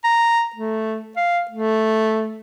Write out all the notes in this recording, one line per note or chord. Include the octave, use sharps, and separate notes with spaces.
A#5
A3
F5
A3